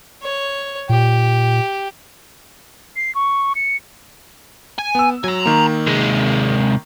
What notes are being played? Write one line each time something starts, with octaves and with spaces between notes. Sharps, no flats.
C#5
A#2 G4
C7
C#6
C#7
G#5
B3 E6
F#3 G#5 A#5
D#3 A#3
C3 G#3